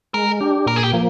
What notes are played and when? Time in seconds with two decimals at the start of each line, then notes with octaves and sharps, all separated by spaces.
0.14 G#3 A#4
0.41 D4 G4
0.66 A#2 A#4
0.76 G#4
0.84 G4
0.93 F3 A#3